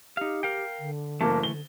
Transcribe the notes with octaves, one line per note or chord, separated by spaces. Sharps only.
D#4 G4 F5
A#4 F5 G5
D3
F#1 E3 A3 A#3 A5
D3 G7